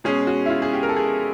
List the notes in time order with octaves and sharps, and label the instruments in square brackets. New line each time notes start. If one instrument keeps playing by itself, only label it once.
[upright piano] B2 G#3 C#4 G#4
F#4
E4
F4
G#4
G4
A#4
A4
G#4